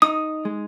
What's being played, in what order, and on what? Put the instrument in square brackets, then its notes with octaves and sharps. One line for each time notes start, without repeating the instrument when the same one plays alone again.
[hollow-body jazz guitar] D#4 [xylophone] D#6
[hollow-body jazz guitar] G#3